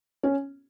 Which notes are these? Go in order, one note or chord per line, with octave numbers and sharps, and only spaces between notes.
C#4